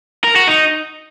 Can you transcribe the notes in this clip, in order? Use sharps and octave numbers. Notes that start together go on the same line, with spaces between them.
A#4
F#4
D#4